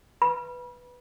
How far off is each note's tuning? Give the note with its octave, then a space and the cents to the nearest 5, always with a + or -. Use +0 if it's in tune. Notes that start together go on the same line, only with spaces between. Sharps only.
B4 +0 B5 -35